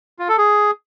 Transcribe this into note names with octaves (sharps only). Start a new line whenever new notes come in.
F4
A4
G#4